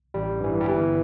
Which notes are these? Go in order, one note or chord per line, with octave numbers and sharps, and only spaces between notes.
A1 G3
G2 E3
G3
G1 E3